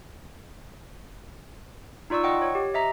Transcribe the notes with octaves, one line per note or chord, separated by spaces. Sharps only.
D#4 F4 D5 C#6 E6
D#5 F#5 G5 C#6
C#5
G4
D#5 E5 A#5